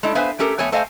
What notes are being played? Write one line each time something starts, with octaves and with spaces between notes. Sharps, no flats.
G#3 A3 D4 E4
B3 B4 C5 E5 F5 G#5
A3 C#4 G4 A4 A#4
F2 A3 B3 A4 C#5 G#5
A3 A4 C5 D#5 F5 G#5